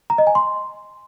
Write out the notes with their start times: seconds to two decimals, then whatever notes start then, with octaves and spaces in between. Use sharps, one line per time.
0.10 A#5
0.18 D#5
0.27 G#5
0.35 C6